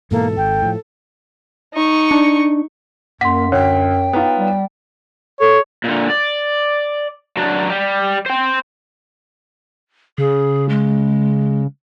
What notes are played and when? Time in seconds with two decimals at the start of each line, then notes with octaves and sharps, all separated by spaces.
0.11 G#2 B2 E3 A#3 A4
0.37 G#1 G5
0.62 A2 F3
1.74 D#4 C#6
2.11 D4
3.21 F#2 A#3 F#5 C6 B6
3.52 D2 C#5 G5
4.13 B3 D#4 F4
4.37 G3
5.40 A4 C#5
5.84 A#2 D3
6.10 D5
7.37 F#3 D4
7.69 G3 G4
8.26 C5 G5
10.18 C#3 G#4
10.69 G#3